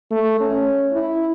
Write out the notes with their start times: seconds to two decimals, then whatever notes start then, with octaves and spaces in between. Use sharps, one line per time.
0.11 A3
0.40 C#4
0.93 E4